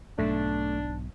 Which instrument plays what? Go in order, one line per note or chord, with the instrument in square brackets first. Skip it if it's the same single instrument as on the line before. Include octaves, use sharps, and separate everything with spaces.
[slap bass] B1 G#2 [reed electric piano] A3 [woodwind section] D4